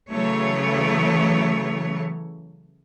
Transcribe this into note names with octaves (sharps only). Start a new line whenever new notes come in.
C#3 E3 F#3 A3 C#5